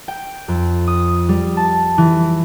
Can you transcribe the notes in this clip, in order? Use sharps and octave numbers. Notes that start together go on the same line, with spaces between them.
G5
F2
D#6
G3
A5
E3